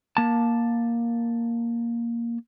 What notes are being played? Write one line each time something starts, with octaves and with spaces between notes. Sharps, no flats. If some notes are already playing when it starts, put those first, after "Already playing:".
A#3 A5